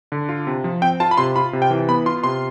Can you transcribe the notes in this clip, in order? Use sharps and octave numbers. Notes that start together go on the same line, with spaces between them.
D3
F4
C3
F3
C4 G5
F4 A5
B5
C3 C6
F4 B5
C3
G5
E3
B3 B5
F4 C6
C3 C6